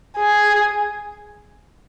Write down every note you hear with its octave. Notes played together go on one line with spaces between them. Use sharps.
G#4